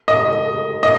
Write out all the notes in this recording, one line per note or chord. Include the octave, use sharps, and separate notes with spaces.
D#5
D#5